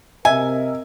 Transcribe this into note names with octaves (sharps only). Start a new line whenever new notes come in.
C3 A#4 D#5 E5 G#5